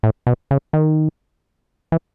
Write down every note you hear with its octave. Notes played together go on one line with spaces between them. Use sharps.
A2
B2
C#3
D#3
E3